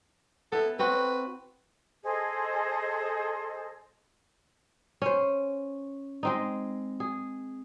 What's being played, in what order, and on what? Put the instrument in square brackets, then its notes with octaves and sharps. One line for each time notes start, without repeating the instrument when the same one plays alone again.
[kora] B3 E4 [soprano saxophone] A4
[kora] C4 F#4 [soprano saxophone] B4
[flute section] G#4 A4 C5 D#5
[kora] C#4 C5
G#3 C4 D#4
G#4